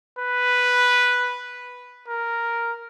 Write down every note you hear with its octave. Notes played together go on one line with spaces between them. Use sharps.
B4
A#4